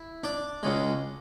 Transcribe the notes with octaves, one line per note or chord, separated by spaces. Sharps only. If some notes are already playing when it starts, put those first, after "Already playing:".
Already playing: E4 E5
D4 D5
C#2 C#3 G#3